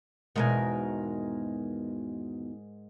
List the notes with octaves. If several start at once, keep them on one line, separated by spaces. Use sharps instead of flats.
E2 G#2 B2 D#3 A#4 G#5